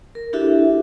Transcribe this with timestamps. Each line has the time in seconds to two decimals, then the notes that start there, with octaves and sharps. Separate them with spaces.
0.15 A#4
0.33 D4 E4 F#4 G4 A4 E5